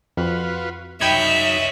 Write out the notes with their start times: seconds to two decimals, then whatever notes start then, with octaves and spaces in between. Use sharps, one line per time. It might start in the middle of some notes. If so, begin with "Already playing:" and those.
0.17 F2 F4 F#4 B4
1.01 F#2 D#4 C#5 D#5 E5 G5 B5 G#6